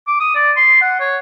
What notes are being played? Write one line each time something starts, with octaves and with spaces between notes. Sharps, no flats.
D6
D#6
D5
C6
F#5
C#5